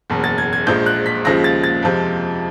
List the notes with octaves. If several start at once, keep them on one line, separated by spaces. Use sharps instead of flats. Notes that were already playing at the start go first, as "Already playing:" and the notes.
F#1 E2 B2
A6
G#6
G#6
A#1 A#2 F3 G#3 G6
F#6
B6
D#2 C#3 F3 G#3 A#6
A6
A6
F2 C3 F3 G#3